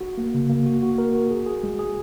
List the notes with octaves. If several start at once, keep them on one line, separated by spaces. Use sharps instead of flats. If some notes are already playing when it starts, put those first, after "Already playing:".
F#4
A#3
C#3
A#3
F#4
F#4
A#4
F#4
G#4
G#4
G#3
G#4